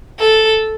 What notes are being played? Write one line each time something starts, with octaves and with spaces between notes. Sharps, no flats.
A4